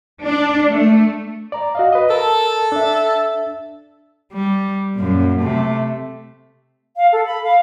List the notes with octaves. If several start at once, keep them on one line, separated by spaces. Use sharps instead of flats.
D4
A3
D5 A#5
F#4 D#5 F5
B4 D#5
A4 A#4 A5
D4 E5
G3
F#2 A#2
C3 A3
F5
A4
B5
F5